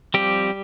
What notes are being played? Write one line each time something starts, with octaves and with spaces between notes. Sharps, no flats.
F3 G3 C4 G4